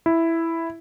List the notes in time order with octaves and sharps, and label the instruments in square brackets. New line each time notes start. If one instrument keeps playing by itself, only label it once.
[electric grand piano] E4